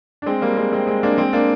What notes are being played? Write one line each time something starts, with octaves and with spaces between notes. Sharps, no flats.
D4
G#3 C4
G3 A#3
G#3 C4
G#3 C4
G#3 C4
A#3 D4
G#3 C4
A#3 D4